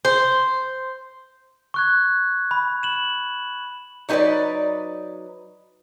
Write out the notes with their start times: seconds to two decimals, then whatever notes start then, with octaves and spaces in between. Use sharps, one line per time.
0.05 C5
1.74 C#6 F#6 G#6
2.51 B5
2.83 E7 F#7
4.09 F#3 D#4 G4 A4 B4 D5